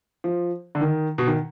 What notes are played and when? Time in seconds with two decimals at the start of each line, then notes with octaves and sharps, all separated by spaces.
0.24 F3
0.75 D3
0.81 D#3
1.18 B2
1.27 D#3